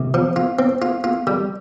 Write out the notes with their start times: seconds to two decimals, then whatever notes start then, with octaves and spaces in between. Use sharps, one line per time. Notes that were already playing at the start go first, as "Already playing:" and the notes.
Already playing: C2
0.14 F3
0.36 F4
0.59 C4
0.82 F4
1.04 F4
1.27 G3